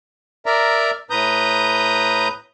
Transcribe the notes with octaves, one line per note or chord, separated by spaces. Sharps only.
A#4 D5 E5 A#5
A2 B4 A#5 D#6 G6